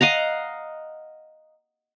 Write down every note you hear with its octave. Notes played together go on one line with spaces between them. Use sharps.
D#5 F5 F#5 A#5